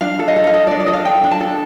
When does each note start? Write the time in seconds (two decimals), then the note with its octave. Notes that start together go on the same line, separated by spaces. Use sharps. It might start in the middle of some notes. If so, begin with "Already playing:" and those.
0.01 D4 F5
0.19 A4
0.28 D#5
0.36 A4
0.47 F5
0.53 A4 D#5
0.67 D5
0.71 D4
0.80 D5
0.86 A4 D#5
0.93 F5
1.05 D4 G5
1.24 D4
1.31 A5
1.40 A4